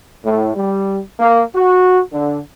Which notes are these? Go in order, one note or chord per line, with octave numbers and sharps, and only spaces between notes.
A2
G3
A#3
F#4
D3